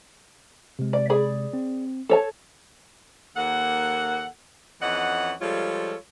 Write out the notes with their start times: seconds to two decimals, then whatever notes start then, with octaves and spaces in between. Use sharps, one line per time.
0.79 C3 G#3
0.93 D5
1.10 G#4 D5 B5
1.53 C4
2.09 A4 C#5 A5
3.36 D#2 A#3 A4 F#5
4.82 F2 E3 C#4 D#5 F#5
5.41 F3 G3 G#3 F4 A4 C#5